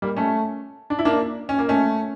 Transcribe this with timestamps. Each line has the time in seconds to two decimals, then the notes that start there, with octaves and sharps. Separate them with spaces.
0.02 G3 A#3
0.17 A3 C#4
0.90 D4
0.99 E4
1.05 A#3 D4
1.49 C#4
1.59 A#3
1.69 A3 C#4